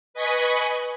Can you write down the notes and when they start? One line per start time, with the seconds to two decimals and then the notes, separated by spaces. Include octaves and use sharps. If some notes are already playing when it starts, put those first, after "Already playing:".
0.14 B4 D#5 G#5 B5 C#6